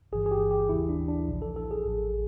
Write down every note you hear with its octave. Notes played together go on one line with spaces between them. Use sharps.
G1 G2 E3 G#4
G#4
G4
G4
D#2 C#3 E3 E4
D4
D4
A#1 A#2 F3
A4
A4
G#4
A1 A2 F3